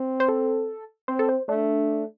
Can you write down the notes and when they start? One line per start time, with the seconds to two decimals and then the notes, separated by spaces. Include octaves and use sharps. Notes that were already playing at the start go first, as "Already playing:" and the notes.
Already playing: C4
0.20 C5
0.29 A4
1.08 C4 C5
1.19 A4
1.29 C5
1.48 A3 D4